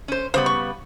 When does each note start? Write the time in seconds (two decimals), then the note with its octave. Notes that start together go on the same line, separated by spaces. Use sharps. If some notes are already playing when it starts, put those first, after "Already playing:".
0.08 C#4 C5
0.34 C#3 G3 B3 C5
0.46 C#6